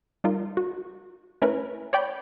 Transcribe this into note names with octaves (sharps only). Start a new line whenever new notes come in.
G3 D#4 F4 A#4
F#4
A3 C#4 E4 A#4 B4
C#5 D5 G5 B5 G6